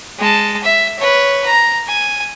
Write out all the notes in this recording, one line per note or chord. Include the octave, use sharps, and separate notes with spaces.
G#3 A5
E5
B4 C#5
A#5
G#5